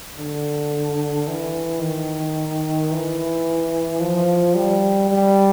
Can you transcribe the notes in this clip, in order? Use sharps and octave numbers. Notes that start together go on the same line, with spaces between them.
D3
E3
D#3
E3
F3
G3
G3